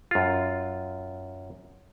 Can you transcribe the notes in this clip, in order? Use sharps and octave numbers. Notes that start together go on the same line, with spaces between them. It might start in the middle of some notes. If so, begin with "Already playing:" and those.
F#2 F4